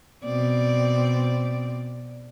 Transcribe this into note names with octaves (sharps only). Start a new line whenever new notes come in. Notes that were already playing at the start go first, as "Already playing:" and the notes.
B2 C4 D5